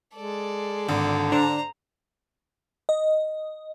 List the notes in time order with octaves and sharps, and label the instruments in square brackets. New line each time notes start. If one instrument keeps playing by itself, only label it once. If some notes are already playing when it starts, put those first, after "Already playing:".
[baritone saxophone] G#3 [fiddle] A4 D5
[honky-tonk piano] G#1 [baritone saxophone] D3
[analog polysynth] D4 [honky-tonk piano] C5 [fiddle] A#5
[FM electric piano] D#5